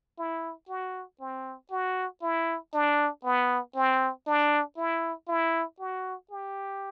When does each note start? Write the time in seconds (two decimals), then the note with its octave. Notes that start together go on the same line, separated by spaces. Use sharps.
0.18 E4
0.68 F#4
1.20 C4
1.71 F#4
2.22 E4
2.74 D4
3.24 B3
3.76 C4
4.27 D4
4.77 E4
5.28 E4
5.79 F#4
6.31 G4